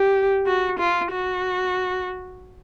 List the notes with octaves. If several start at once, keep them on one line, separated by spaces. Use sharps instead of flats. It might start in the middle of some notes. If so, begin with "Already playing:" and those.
Already playing: G4
F#4
F4
F#4